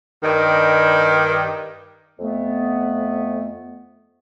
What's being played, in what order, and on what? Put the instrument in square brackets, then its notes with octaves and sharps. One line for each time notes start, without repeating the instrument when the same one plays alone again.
[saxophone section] G2 D#3
[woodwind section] F2 A3 B3